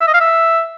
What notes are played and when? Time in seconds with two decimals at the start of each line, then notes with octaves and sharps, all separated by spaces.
0.01 E5
0.07 D#5
0.14 F5
0.20 E5